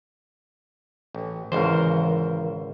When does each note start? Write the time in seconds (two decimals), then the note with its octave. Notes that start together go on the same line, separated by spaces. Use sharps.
1.15 A1
1.52 G#1 C#2 E3 A#4 C5